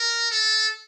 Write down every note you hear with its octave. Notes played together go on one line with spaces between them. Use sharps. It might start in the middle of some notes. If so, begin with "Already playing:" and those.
Already playing: A#4
A4